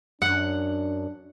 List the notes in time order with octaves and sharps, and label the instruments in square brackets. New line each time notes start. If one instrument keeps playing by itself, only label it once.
[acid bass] F#2 [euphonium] D4 [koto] F#5